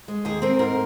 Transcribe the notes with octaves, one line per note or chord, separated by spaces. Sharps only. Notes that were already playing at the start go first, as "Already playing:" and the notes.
G#3
D#2 G#4
C4 A#4
G#2 A#4